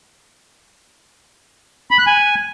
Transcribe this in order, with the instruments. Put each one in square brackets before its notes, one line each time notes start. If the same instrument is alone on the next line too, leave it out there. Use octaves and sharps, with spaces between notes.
[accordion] B5
F#6
G#5